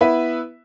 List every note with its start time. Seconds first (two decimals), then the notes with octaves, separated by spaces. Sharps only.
0.01 B3 E4 B4 E5